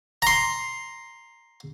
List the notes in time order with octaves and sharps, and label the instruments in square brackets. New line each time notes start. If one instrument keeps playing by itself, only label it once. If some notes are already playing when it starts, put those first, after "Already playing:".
[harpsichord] A#5 C6